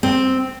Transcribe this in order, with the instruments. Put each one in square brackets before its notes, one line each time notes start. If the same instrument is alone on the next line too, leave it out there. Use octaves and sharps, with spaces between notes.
[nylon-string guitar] C4